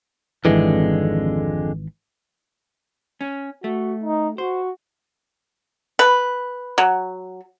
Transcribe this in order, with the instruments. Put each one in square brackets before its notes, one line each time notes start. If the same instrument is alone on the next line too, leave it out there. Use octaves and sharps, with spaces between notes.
[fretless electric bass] G#1 E3 [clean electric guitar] F2 D3 G#3
[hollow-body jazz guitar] C#4
[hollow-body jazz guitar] A3 [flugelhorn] F#4
[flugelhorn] D#4
[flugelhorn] F#4 [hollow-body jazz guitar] C5
[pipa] B4
F#3